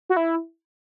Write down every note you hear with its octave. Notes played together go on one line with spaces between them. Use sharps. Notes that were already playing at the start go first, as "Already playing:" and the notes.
F#4
E4